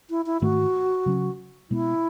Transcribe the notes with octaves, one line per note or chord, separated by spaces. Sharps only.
E4
E4
G#2 D#3 A3 F#4
C#3 F#3 C#4
B2 G#3 B3 E4